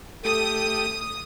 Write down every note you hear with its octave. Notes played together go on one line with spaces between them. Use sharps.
A3 G4 A4 D#6